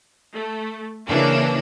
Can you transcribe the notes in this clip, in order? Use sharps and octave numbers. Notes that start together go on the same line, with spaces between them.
A3
C#3 E3 A#3 D4